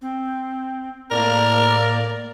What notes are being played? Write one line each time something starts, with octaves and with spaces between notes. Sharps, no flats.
C4
A2 A#3 A#4 D5